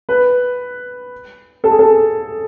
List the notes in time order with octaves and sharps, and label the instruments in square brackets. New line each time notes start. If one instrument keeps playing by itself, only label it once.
[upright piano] B4
A4
G#4
A4